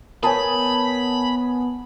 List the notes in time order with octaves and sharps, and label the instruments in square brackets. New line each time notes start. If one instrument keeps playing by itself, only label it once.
[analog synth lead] B3 [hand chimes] A#4 C#5 [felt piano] G#5 A5 D#6 [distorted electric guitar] B5